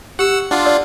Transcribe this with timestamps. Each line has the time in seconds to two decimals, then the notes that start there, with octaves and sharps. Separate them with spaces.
0.19 G4 F#5 E6
0.51 D4 F4 F#5 C6
0.65 A#4 D5